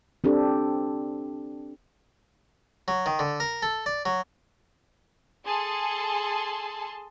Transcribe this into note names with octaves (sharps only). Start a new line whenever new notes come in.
C4 D4 G4 A4
F#3
D#3
D3
A#4
A4
D5
F#3
G#4 A4 A5 C6